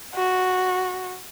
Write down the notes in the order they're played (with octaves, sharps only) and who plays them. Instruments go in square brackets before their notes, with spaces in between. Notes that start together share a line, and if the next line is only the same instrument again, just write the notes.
[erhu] F#4